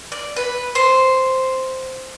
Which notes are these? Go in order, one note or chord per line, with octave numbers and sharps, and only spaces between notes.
D5
B4
C5